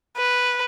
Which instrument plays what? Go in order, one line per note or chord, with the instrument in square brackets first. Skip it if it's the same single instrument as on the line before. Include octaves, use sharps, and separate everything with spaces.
[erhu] B4